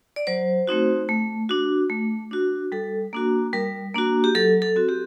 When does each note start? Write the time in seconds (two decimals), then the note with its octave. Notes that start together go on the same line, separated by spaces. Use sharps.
0.16 D5
0.27 F#3 C5
0.67 A3 C4 D#4 F#4
1.09 A3
1.49 D4 F#4
1.90 A3
2.31 D4 F#4
2.72 G3 A4
3.13 A#3 D4 F#4
3.53 G3 A#4
3.94 A#3 D4 F#4
4.24 G4
4.35 F#3 A4
4.62 A4
4.76 C4 F#4
4.89 G4